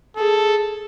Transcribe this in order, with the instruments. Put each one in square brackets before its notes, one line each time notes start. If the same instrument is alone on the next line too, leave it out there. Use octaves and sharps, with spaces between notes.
[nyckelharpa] G#4 [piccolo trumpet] A4